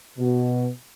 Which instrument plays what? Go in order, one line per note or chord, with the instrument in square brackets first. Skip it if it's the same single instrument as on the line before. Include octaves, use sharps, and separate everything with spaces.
[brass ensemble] B2